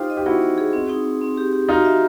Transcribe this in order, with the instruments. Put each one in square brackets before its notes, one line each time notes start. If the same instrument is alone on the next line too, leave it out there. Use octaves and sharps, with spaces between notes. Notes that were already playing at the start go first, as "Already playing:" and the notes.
Already playing: [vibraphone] D#4 C5 [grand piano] F4 G4
[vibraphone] D#5
[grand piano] G4
[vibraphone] D#4 [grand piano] E4 F#4
[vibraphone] D#4
G#4
C4
D#4
C4
C4
G4
G4
[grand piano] D#4 F4 [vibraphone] F#4
[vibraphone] E5